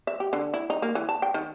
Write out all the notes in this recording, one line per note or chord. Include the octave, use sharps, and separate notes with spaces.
E5
G4
D3
E4
D#4
A#3
E3
A5
G5
D#3